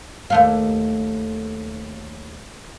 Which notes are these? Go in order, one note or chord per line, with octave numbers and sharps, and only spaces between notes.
D#2 A3 F5